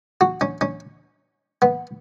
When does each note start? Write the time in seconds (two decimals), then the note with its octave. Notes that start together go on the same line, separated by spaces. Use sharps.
0.21 F#4
0.41 C#4
0.61 C#4
1.62 B3